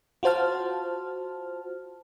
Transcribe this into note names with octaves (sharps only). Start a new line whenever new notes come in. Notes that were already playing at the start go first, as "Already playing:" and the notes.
F4 F#4 C5 A5 F6